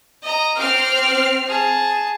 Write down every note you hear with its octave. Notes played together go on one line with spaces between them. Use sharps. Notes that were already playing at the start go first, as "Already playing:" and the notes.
D#5 A#5
C4 G5 D6 F6 C7
G#4 A5